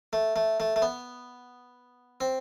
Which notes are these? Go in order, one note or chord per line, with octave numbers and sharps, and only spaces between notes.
A3
A3
A3
A3
B3
C4